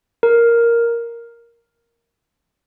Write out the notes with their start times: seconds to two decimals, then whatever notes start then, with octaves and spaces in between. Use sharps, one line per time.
0.23 A#4